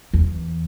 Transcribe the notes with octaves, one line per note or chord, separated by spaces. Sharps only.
E2